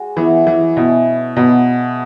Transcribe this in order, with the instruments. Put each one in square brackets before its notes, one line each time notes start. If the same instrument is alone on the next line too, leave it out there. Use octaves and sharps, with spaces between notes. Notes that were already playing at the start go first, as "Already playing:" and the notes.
Already playing: [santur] G#3 F#4
[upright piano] E3 [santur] B3 G#4 C#5 E5
[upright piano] E3
[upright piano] B2 [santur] C#4 E4 C#5
[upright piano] B2 [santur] F#3 B3 F#4